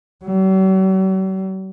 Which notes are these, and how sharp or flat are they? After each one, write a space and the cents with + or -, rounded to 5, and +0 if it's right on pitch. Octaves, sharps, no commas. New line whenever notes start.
F#3 +45